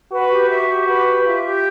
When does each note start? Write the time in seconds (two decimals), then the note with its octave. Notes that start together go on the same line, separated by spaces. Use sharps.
0.12 F#4 B4
0.31 G4
0.49 E5
0.69 G4
0.88 B4
1.07 G4
1.25 F4 E5
1.45 G4